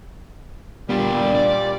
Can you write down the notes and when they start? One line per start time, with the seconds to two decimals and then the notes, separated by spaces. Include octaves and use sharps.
0.89 A#2 G3 B3 D4
1.35 D5